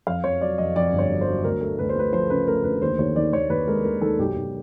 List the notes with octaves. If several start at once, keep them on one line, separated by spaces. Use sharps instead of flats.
F2 F5
F2 C#5
F#3 D5
F2 D#5
F2 D5
G1
C#5
F#3
C5
F#3
D2 A#4
A3
D2 B4
C5
A3 B4
F3 C5
C#3 B4
A3 A#4
D2 B4
D#2 C5
D#2 C#5
D#3 D5
D#2 C#5
D#2 B4
G#3 A#4
D#2 A#4
D#3 A4
B1 G4
B1